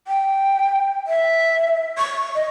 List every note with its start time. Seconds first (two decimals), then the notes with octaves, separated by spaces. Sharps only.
0.08 G5
1.07 E5
1.98 C#6
2.35 D#5